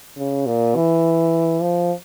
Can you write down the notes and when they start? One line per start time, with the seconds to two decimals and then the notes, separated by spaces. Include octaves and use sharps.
0.17 C#3
0.46 A#2
0.76 E3
1.62 F3